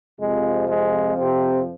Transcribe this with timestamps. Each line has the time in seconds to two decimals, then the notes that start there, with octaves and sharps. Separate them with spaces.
0.19 F2 C3 F3 G#3
0.68 G#3
1.17 C3 C4